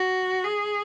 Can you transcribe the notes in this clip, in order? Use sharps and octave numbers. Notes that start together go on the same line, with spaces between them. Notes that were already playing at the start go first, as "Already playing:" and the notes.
Already playing: F#4
G#4